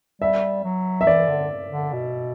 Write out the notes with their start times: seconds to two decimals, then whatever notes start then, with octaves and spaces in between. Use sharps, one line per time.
0.22 G3 E5
0.64 F#3
1.01 E5
1.07 E3 D5
1.28 D3
1.71 D3
1.93 B2